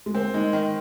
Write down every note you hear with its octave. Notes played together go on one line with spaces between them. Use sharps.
G#3
A#3 C4
G#3 D#4
D#3